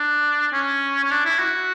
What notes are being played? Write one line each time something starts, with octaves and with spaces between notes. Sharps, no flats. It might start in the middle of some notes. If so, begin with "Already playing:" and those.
Already playing: D4
C#4
C#4
D4
E4
F#4